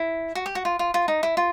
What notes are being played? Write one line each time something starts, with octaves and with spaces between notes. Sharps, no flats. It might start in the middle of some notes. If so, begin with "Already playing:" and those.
Already playing: E4
F#4
G4
F#4
F4
F4
F4
D#4
E4
F4